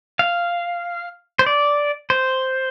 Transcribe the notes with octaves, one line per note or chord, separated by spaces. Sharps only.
F5
C5
D5
C5